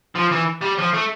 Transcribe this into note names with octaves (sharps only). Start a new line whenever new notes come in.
F3
E3
G3
F3
A3